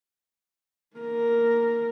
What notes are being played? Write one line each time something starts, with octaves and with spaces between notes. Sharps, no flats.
A#3 A#4